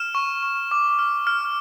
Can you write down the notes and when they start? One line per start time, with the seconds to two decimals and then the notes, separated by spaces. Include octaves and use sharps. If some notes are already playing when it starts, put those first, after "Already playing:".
Already playing: F6 E7
0.15 C#6
0.43 C#6
0.71 D6
0.99 F6
1.27 F6